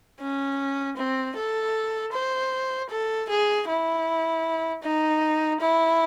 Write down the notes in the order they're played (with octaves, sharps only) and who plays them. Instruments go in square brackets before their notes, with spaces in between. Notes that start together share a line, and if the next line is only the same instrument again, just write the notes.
[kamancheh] C#4
C4
A4
C5
A4
G#4
E4
D#4
E4